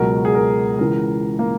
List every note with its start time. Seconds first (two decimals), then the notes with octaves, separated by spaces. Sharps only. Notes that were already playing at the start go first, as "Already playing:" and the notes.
Already playing: C#2 B2 F#3 A#4
0.25 G#4
0.35 A#4
0.79 C#2 C#3 E3 A#4
1.39 A#3